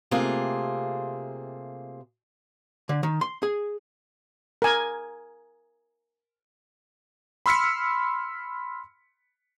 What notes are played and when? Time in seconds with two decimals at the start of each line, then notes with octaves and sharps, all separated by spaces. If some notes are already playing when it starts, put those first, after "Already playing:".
0.11 C3 A3 A#3 F4 G#4
2.89 D3
3.03 D#3
3.21 C6
3.43 G#4
4.62 A#4 G#5
7.46 B5 C6 E6 F6 B6 C#7